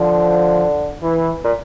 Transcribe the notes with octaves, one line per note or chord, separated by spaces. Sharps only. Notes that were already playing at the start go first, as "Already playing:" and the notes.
Already playing: D3 F3
E3
A#2